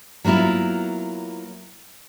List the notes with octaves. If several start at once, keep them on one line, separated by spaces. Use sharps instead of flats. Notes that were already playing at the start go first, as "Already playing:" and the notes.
F#3 A#3 B3 E4 F4